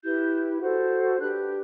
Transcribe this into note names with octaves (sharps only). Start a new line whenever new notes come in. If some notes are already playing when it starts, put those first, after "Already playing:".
E4 G4 B4 G6
F#4 A4 C5
D4 G4 B4 F#6